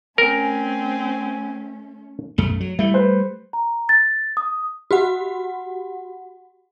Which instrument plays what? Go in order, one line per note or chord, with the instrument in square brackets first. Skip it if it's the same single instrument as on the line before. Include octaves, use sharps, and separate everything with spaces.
[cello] A3 C#4 [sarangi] C4 [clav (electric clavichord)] A#4 [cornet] G#5
[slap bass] B1 F#2 A3
F#3
[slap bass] G3 A3 [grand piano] E4
[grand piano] B4 C5
[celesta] A#5
A6
D#6
[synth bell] F#4 G4 F#5